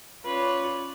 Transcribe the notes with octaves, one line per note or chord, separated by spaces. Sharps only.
C#4 F4 B4 C#5 D5